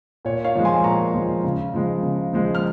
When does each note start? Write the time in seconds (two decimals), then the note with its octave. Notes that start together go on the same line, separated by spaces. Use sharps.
0.25 A#2 C#5
0.44 C#5 F5
0.56 F3 G#3
0.65 G#5 C6
0.84 A#2 A#5 C#6
1.14 F3 G#3
1.44 C#3
1.74 F3 G#3
2.03 C#3
2.34 F3 G#3
2.55 F6